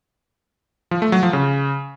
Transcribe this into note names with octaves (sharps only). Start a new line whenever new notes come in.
F3
A3
F#3
F3
C#3